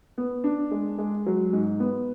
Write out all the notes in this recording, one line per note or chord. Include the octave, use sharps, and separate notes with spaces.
B3
D4
G#3
G#3
F#3
G#2
B3